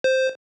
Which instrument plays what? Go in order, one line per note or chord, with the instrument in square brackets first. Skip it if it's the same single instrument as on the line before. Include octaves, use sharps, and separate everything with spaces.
[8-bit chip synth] C5